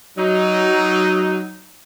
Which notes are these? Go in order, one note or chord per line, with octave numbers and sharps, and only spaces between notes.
F#3 D#4